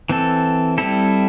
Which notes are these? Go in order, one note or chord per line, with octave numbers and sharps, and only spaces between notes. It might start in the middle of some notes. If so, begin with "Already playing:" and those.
E3 C4 A4
G3 C4 E4 A4